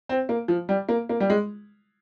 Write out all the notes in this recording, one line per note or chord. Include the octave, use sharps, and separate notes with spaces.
C4
A#3
F3
G3
A#3
A#3
G3
G#3